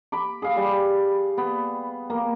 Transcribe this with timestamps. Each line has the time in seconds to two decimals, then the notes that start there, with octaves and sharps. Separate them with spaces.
0.12 B5 D6
0.42 G#4 F5
0.56 G3
1.38 B3
2.10 A#3